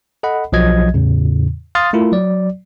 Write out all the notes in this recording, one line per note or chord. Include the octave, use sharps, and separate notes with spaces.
A4 D#5 F#5 B5
B1 F3 F#3 D#5 G#6
E2 A2 C#3
F5 C6 D#6 F6 A6
A3 E4 F4 A#4
F#3 D5